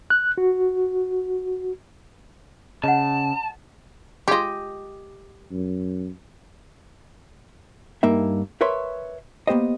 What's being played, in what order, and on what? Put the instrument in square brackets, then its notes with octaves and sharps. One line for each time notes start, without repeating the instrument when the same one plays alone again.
[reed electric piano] F#6
F#4
[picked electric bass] C#3 [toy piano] D#5 F#5 [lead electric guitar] A5
[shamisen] G#3 F4 [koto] G4 D#5
[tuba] F#2
[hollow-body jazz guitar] G2 A#3 D#4 E5
A#4 B4 C#5 E5 C6
A#3 B3 G4 C5 D#5